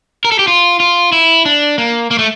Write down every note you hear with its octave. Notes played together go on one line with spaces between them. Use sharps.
A#4
A4
G4
F4
F4
E4
D4
A#3
A#3
A3